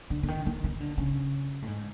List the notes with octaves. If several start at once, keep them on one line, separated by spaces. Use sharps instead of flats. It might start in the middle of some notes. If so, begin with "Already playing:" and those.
D3
D3
D#3
D#3
D#3
D3
C#3
A2
G#2